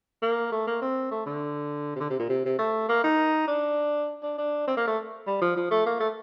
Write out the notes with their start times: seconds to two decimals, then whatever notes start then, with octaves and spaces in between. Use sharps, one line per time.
0.22 A#3
0.52 A3
0.67 A#3
0.82 C4
1.11 A3
1.26 D3
1.96 C3
2.00 D3
2.10 C3
2.20 A#2
2.29 C3
2.45 C3
2.59 A3
2.89 A#3
3.04 D#4
3.48 D4
4.23 D4
4.38 D4
4.67 C4
4.77 A#3
4.87 A3
5.27 G3
5.42 F3
5.57 F3
5.71 A3
5.86 A#3
6.00 A3